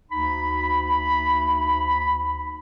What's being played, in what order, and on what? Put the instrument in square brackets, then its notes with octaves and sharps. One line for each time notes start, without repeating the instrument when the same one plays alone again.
[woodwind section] D2 D#4 B5